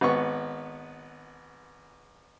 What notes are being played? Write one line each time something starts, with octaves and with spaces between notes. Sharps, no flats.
G#1 B3 C#6